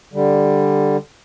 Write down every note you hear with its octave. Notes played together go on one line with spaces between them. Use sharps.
D3 G3